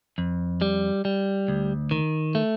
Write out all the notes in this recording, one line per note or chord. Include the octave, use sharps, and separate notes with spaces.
F2
G3
G3
D2
D#3
A3